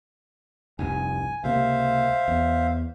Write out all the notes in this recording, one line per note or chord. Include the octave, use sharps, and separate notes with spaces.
F1 C2 G2 G#5
C#2 C3 A#3 C5 E5 F5
E2